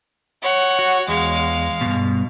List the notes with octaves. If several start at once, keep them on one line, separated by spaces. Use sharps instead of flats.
C#5 F#5
F#4
E2 G#3 F5
G2 B2